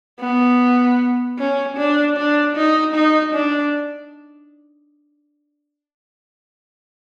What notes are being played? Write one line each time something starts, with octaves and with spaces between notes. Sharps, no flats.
B3
C#4
D4
D4
D#4
D#4
D4